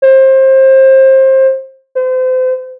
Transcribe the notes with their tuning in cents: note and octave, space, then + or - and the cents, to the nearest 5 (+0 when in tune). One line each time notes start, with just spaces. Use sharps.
C5 +25
C5 -35